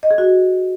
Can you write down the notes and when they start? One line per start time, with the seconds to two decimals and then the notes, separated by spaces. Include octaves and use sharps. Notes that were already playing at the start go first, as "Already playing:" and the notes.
0.03 D#5
0.11 G#4
0.18 F#4